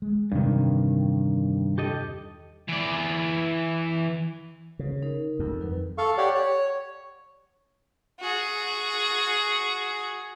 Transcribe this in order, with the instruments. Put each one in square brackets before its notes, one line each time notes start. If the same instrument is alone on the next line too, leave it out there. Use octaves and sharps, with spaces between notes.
[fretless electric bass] G#3
[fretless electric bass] E2 C3 [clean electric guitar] G2 D#3
[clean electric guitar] G4 A4 D#5
[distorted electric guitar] E3 D5
[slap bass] C#3
[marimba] D#4 A#4
[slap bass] F2
[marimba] D#3 F#3 B4
[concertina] A4 F5 C#6
G4 C#5 D5 F#5
C#5
[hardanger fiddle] F#4 G#4